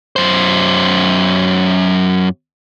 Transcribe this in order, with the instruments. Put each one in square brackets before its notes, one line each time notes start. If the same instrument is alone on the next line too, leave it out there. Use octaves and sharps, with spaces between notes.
[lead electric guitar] F#2 C5